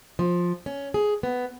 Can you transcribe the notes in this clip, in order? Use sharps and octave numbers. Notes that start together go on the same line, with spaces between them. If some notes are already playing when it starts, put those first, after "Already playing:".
F3
C#4
G#4
B3